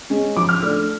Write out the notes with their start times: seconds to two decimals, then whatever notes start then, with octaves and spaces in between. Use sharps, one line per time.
0.10 G#3 C#4
0.36 F3 D6
0.49 F6
0.62 A3 D4 F6